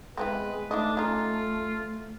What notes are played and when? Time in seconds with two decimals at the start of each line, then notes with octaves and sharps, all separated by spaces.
0.17 E3 G#3 B3 C4 B4
0.71 E3 A3 D4 D#4 D#5
0.97 C#4 D#4 F4